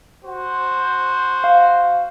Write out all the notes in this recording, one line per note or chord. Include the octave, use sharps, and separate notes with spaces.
F#4 C5
F5